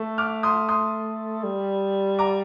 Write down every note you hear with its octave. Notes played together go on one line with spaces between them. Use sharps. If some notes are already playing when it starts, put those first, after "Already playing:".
Already playing: A3
D6 F6
C6 D#6
C6 D#6
G3
A#5 D6